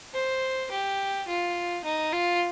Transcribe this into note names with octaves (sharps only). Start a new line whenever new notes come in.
C5
G4
F4
D#4
F4